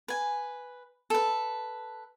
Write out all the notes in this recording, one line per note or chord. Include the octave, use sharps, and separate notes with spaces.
B4 G#5
A4 B4